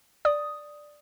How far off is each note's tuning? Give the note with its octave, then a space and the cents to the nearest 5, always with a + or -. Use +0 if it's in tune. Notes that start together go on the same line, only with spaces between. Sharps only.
D5 +5 D#6 +5